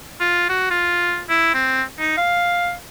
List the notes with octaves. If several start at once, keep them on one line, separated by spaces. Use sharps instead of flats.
F4
F#4
F4
E4
C4
D#4
F5